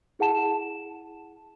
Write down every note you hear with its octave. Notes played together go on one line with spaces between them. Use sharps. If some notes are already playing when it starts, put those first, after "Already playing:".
E4 G#4 F#5 A5 E7